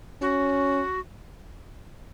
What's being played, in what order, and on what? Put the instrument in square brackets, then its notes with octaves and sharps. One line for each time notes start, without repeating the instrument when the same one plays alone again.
[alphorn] C#4 [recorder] F#4